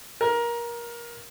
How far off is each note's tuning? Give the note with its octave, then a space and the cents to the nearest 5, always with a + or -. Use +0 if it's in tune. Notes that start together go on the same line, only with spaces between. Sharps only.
A#4 +20